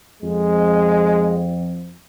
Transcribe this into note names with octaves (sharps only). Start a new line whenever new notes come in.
F2 G#3